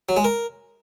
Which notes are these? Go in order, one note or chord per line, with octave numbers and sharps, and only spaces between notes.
F#3
G#3
A#4